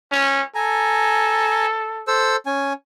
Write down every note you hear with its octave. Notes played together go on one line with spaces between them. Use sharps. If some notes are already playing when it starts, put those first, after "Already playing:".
C#4
A4 G#5 A#5
A4 C5 E6
C#4 G#5